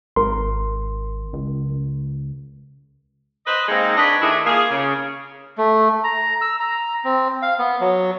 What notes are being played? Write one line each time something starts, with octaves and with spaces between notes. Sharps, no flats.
G#1 A#4 C6
C#2
B4 C5 D#5
G#3 A#3 C4 D#4
D4 B4 C#5 D#5
D#3 A3 D4 E4 G#4
A#3 F4 G#4
C#3
A3
A#5
E6
A#5
C4
F5
B3
F#3